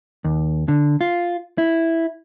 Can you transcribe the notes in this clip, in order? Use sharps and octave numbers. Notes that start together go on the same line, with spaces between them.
D#2
D3
F4
E4